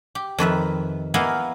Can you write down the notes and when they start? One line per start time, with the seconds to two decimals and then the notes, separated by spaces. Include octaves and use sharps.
0.15 G4
0.38 F2 D#3 B4 E5
1.14 A#3 B3 E4 D#5 F5 G#5